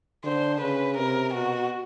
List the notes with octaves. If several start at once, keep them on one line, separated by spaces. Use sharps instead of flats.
D3 C5
C#3 B4
C3 A#4
B2 F#4